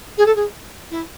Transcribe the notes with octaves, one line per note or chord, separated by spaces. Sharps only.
G#4
A4
G#4
E4